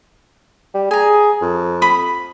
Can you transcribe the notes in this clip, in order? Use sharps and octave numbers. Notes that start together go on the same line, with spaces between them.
G3
G#4 G#5 A#5
F2
B5 D#6